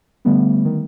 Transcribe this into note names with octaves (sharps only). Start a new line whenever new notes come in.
D3 G3 A3 B3
D#3